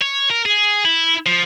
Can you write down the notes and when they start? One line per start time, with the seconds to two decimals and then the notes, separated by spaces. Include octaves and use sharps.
0.02 C#5
0.30 A#4
0.45 G#4
0.85 E4
1.26 F3